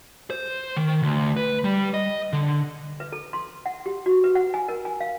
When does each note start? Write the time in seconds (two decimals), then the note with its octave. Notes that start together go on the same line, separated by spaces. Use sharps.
0.30 C5
0.77 D#3
1.03 D2
1.36 B4
1.64 G3
1.94 D#5
2.33 D3
3.00 B4
3.12 A4
3.33 C6
3.66 F#5
3.86 G4
4.06 F#4
4.24 B4
4.35 F#5
4.54 G#5
4.68 A#4
4.85 G#5
5.01 F5